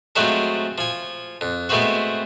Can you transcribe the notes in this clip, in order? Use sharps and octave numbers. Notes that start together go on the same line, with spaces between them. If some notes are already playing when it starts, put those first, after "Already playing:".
F3 F#3 G#3 A3 C4 F#4
F3 G#5
F2
G#3 A3 B3 C4 F#4